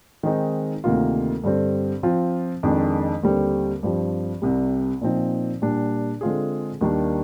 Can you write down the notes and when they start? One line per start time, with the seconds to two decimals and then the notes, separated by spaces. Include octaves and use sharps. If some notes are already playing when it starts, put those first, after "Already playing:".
0.23 D#3 G#3 C4 D#4
0.84 D2 C3 D#3 A#3 F4
1.44 G2 D3 G3 C4
2.03 F3 C4 F4
2.63 F2 D#3 G#3 D4
3.23 D#2 D3 G3 C4
3.83 G2 F3 C4 G4
4.42 C2 C3 G3
5.01 A#2 F3 C4 D#4
5.62 A#2 G3 D4
6.21 D3 G#3 C4 F4 G#4
6.81 D#2 D#3 G3 A#3 D4